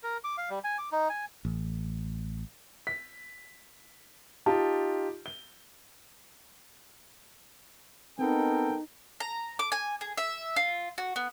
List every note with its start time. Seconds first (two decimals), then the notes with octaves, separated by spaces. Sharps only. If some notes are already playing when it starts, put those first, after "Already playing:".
0.03 A#4
0.24 D6
0.38 F5
0.50 G3
0.64 G#5
0.78 D6
0.92 D#4
1.10 G#5
1.45 A1
2.87 B6
4.46 D#4 F4 G4 A5
5.26 G7
8.19 B3 C4 D#4 A4 A#4 G5
9.20 A#5
9.59 D6
9.72 G#5
10.01 G#4
10.18 E5
10.56 F4
10.98 F#4
11.16 B3